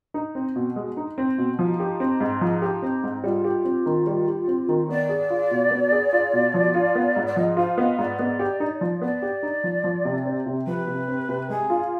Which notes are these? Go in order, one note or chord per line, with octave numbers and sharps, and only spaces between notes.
D#4
C4
B2
G#3
D#4
C4
B2
F3 D#4
G4
C4
G#2
F3
G4
C4
G#2
G3 F4
G4
C4
D#3
G3
G4
C4
D#3
B3 D5
G#4
F4
B2
B3
G#4
F4
B2
F3
F4
B3
G#2
D5
F3 D#5
F4 C5
B3 D#5
G#2 D5
B3
G4
D#4
F3
B3 D5
G4
D#4
F3
F3
C3
C4
C3
F3 B4
C3
C4
C3
G#3 G#4
F4